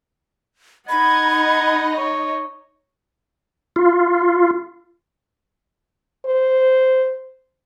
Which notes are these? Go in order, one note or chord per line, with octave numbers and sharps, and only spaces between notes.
D#4 D#5 F#5 B5 G#6
C#5
F4
C5